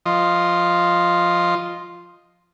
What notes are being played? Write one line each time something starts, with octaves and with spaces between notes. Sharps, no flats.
F3 F4 D#5